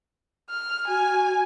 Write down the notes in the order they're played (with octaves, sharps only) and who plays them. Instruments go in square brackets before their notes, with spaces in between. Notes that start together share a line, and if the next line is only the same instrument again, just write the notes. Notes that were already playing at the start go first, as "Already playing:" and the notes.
[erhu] F6
[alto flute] F#4 [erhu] G#5